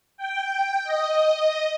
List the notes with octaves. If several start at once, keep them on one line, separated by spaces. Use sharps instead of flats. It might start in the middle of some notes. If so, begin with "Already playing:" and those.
G5
D#5